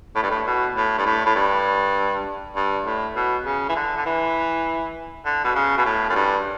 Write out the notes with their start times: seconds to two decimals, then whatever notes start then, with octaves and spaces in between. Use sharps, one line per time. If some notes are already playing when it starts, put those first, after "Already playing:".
0.16 A2
0.23 G2
0.30 A2
0.46 B2
0.76 A2
0.98 G2
1.06 A2
1.26 A2
1.35 G2
2.56 G2
2.86 A2
3.16 B2
3.46 C#3
3.69 E3
3.76 D3
3.97 D3
4.05 E3
5.25 D3
5.44 B2
5.55 C#3
5.77 B2
5.85 A2
6.09 F#2
6.15 G2